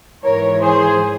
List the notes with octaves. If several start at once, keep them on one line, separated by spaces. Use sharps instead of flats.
G#2 E3 A#4 C#5
G#4 C5